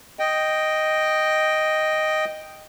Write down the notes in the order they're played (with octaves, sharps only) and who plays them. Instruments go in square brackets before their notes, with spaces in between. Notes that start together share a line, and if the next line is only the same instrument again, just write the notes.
[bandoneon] D#5 G5